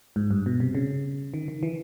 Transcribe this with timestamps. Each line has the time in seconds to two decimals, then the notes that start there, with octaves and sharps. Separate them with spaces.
0.16 G#2
0.31 G2
0.46 B2
0.60 C3
0.75 C#3
1.34 D#3
1.48 D#3
1.63 E3